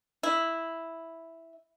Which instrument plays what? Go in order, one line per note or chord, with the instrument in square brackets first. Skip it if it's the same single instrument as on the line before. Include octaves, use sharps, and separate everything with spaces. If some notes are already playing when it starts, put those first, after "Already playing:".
[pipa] E4